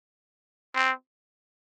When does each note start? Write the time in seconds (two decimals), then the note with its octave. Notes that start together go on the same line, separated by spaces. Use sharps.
0.75 C4